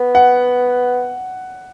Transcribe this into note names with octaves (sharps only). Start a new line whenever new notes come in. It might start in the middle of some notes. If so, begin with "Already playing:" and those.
Already playing: B3
F#5